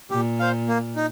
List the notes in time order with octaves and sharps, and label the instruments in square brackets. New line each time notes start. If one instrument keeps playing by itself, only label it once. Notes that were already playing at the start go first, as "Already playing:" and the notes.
[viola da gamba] A#2 [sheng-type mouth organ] G4
[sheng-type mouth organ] C5 F5
A#3
D#4